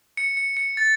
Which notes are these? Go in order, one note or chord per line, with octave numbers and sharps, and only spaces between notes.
C#7
C#7
C#7
A6